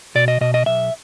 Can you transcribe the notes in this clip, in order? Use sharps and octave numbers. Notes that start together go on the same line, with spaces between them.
B2 D5
D#5
B2 D#5
D#5
B1 E5